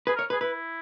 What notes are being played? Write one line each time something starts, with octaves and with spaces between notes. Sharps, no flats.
G#4 B4
A#4 C#5
G#4 B4
E4 B4